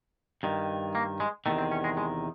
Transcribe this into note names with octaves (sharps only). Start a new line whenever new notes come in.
G2 D#3
A#3
G#3
E2 C3 D#3 A3
C4
C#4
G#3
G#3